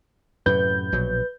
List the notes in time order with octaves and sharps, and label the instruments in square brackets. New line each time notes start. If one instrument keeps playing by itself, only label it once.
[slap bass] F#2 A2 C3 [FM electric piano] B4 G6
[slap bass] A#1 B2 F#3